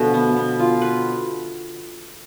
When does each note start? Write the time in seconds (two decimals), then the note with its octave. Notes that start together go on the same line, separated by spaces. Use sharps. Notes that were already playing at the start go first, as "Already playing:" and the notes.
Already playing: B2 D3 F3 A3
0.14 B3
0.36 B3
0.60 F4
0.81 B4